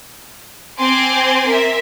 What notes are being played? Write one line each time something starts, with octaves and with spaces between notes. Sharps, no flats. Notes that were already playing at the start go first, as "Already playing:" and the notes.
C4 G#5 C6 D6
A#4 E5